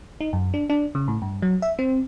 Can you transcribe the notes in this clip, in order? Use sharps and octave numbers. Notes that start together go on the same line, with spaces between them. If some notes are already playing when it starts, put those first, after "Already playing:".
D#4
F#2
D4
D4
C#3
A2
G2
F#3
E5
C4